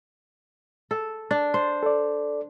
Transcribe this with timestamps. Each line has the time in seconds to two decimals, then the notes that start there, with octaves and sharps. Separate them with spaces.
0.91 A4
1.31 D4 A6
1.54 C5
1.83 A4 D5